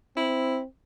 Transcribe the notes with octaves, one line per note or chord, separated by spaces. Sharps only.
C4 E4